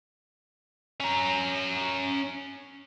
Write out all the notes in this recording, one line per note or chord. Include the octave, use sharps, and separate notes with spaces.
C#4 A#5